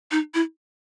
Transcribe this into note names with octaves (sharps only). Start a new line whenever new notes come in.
D#4
E4